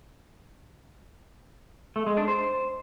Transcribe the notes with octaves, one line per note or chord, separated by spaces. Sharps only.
A3
G#3
D4
C5